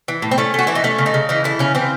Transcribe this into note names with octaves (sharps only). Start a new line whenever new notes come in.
E3
A2
C4
A3 C#4
A3 F#4
E3 E4
D#4
A3 C#4
C#3
D#4
C#3
E3 D#4
A3 E4
C#3 C#4
E3 C4